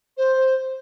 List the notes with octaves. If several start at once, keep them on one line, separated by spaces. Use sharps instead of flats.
C5